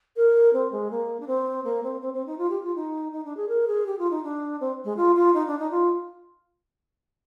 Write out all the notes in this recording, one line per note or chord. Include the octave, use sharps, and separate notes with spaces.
A#4
C4
G#3
A#3
D4
C4
A#3
C4
C4
C4
D#4
F4
G4
F4
D#4
D#4
D4
G#4
A#4
G#4
G4
F4
D#4
D4
C4
G#3
F4
F4
D#4
D4
D#4
F4